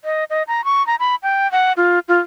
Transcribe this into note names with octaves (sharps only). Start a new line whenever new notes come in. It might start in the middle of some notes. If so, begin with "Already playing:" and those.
D#5
D#5
A#5
C#6
A#5
B5
G5
F#5
F4
F4